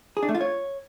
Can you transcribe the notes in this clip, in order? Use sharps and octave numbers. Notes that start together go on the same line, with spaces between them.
G#4
D4
A3
F4
C#5